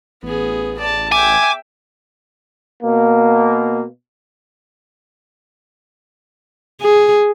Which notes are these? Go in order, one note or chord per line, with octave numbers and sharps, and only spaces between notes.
A1 B3 G#4
D5 A5
E5 G5 G#5 D6
B2 A#3
G#4